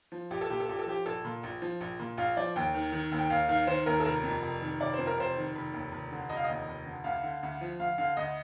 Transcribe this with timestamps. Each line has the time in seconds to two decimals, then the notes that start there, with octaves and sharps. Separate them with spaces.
0.12 F3
0.31 A#1 G4
0.41 A4
0.50 A#2 G4
0.60 A4
0.69 A#1 G4
0.79 A4
0.86 F3 G4
1.06 A#1 A4
1.25 A#2
1.43 A#1
1.62 F3
1.81 A#1
1.99 A#2
2.17 A#1 F5
2.37 F3 D5
2.56 D#2 G5
2.74 D#3
2.92 D#3
3.11 D#2
3.19 G5
3.30 D#2 F5
3.48 D#3 F5
3.67 D#3 C5
3.86 D#2 A#4
4.00 A4
4.05 F1 A#4
4.23 F2
4.42 F1
4.62 D#3
4.80 F1 D5
4.94 F2 C5
5.07 A#4
5.18 F1 C5
5.37 D#3
5.56 F1
5.73 D#2
5.92 F1
6.12 D3
6.29 F1 D#5
6.37 F5
6.44 D#2 D#5
6.68 F1
6.86 D3
7.04 D2 F5
7.23 D3
7.43 D2
7.61 F3
7.79 D2 F5
7.98 D3 F5
8.17 D2 D#5